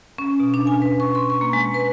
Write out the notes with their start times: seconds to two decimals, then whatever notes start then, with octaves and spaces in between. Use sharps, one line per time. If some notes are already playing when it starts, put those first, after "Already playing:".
0.18 C#4
0.40 B2
0.54 D4
0.67 G#5
0.82 B4
1.00 C#6
1.15 C6
1.30 C#6
1.41 A#3
1.53 G#3
1.74 B4